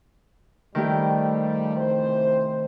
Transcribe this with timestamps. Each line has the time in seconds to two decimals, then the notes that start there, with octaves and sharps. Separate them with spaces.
0.75 D#3 F3 G3 A3 G4
1.77 C3 E3 C5